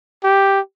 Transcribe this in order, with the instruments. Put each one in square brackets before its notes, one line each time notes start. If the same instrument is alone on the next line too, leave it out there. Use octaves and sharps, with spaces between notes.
[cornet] G4